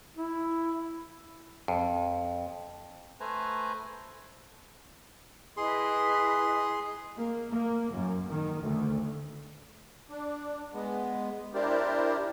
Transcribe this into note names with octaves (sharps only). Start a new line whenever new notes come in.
E4
F2
A3 B4 C5 G#5 A#5
E4 G#4 B4 D#5 C6
A#3
A#3
F#2
D#3
D2
D4
G#3 B3
D4 E4 G4 A#4 C5 D5